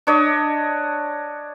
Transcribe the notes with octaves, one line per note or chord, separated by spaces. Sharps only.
D4 C#5 D#5